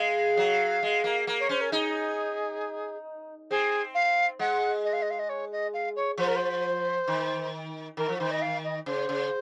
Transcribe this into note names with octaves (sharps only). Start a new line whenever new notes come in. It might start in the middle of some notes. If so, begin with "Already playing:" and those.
Already playing: G#3 F5
F#3
G#3
A#3
A#3
C#5
C#4 C5
A#4
D#4 G#4
C4 G#4
F5
G#3 F#5
D#5
F5
D#5
F5
D#5
C#5
D#5
F5
C#5
F3 C5
A#4
C5
D#3
D#3 A#4
F3
D#3 C5
D#5
F5
D#5
C#3 C5
C#3